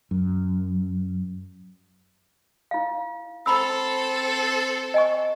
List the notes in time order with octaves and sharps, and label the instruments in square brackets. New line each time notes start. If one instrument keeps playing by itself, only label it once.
[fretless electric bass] F#2
[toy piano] E4 F5
[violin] C4 A4 [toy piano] A#5 B5 E6
[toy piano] D#5 G#5 C#6